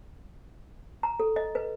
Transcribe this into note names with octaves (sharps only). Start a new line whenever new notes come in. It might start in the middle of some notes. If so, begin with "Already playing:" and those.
A#5
A4
D#5
B4